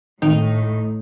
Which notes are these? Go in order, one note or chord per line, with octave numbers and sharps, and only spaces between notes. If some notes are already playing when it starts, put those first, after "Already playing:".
G#1 A2 D#4 G5